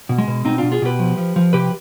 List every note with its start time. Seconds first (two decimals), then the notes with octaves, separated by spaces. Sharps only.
0.09 B2
0.18 G#3
0.28 B2
0.45 B2 C4 D#4
0.58 B2 D4 F4
0.72 F4 G#4
0.82 B2 G4 B4
0.99 F3
1.18 F3
1.36 F3
1.53 C3 G4 B4